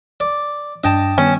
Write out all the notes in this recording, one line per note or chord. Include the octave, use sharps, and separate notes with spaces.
D5
G2 D4 D#5 G5 A5
D#3 G3 B3 C#4